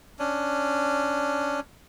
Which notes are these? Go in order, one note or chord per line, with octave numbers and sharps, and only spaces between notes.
C#4 D4